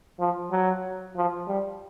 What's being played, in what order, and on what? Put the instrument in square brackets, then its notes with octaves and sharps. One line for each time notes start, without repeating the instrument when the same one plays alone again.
[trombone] F3
F#3
F3
G3